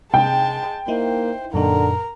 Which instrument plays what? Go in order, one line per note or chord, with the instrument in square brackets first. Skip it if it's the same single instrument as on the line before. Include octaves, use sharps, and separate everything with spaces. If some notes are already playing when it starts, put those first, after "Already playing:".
[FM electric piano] C3 [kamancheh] G#3 A5 [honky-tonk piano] G5
[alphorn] A#3 [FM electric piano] D#4 E4 [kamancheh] C5
[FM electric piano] F#2 A#2 D#4 [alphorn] D3 [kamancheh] A#4 A#5